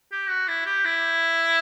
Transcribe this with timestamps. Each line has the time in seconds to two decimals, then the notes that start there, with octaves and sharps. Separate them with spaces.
0.12 G4
0.29 F#4
0.48 E4
0.66 G4
0.85 E4